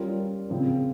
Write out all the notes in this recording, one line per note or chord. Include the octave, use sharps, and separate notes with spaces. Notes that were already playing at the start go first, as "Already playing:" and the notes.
Already playing: G3 C#4 F4 A#4
C#3 F3 C4